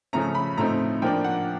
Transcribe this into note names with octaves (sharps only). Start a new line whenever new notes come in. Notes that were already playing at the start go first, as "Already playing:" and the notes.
C#3 F3 A3 C#4 A#5
B5
A2 F3 A3 C4 D#4 A#5
F3 A#3 D4 G5
F#5